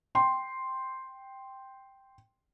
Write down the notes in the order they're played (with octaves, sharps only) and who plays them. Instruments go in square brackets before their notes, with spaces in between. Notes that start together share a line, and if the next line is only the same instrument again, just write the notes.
[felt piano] G5 C6